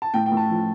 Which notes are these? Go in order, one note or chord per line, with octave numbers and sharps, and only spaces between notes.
A5
A2 G5
G5
A2
A5
F3